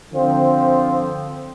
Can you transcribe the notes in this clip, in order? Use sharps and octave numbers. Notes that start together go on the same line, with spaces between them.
D3 F3 C4